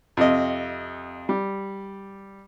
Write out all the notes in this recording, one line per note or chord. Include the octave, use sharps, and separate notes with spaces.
F2 C3 D#5
G3